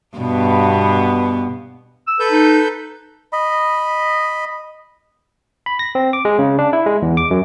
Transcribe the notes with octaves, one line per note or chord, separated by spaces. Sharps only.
G2 B2 B3
E6
A4 B4 G6
D#4
D#5 B5
B5
A#6
C4
D6
G#3
C#3
D4
E4
G#3
E2
D6
F#2